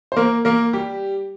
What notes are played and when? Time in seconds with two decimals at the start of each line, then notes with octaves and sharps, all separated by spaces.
0.12 C5
0.16 A#3 A#4
0.45 A#3 A#4
0.73 G3 G4